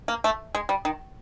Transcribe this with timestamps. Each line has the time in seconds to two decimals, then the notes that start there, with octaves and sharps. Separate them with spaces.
0.08 A#3
0.24 A3
0.55 G#3
0.69 G3
0.85 D#3